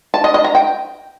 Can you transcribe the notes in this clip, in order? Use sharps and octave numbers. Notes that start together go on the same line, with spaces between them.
A5
D#5
D#5
A#5
G5